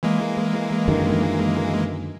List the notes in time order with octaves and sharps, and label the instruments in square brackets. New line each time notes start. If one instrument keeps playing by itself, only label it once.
[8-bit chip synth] E3 G#3 A#3
[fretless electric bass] F#2 D3 D#3